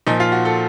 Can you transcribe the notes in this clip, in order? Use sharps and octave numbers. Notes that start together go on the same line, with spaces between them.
A#2 F3 D#4
F4
F#4
A4